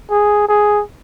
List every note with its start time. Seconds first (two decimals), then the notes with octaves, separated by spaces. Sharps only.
0.11 G#4
0.48 G#4